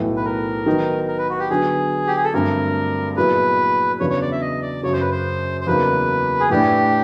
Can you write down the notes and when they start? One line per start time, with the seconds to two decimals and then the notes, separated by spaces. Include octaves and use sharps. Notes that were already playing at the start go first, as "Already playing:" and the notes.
Already playing: B1 A2 E3 A3
0.17 B4
0.25 A#4
0.66 D#3 F#3 B3 D#4
1.08 A#4
1.18 B4
1.30 F#4
1.39 G4
1.50 D3 F#3 B3 G#4
2.07 G4
2.16 G#4
2.24 A4
2.34 G2 D3 F#3 A3 C4 A#4
3.16 A#2 F#3 B3 E4 G#4 B4
4.00 E2 C#3 F#3 B3 D4 C#5
4.10 C#5
4.21 D5
4.32 E5
4.41 D#5
4.62 D5
4.83 F#2 C#3 F#3 C#5
4.93 C5
5.01 B4
5.11 C5
5.61 C5
5.67 E2 C#3 F#3 A#3 D#4 B4
6.40 G#4
6.50 A2 E3 A3 D4 G4